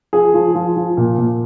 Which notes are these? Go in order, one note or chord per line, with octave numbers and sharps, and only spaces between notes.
F3 G#4
F3
F3
F3
A#2
A#2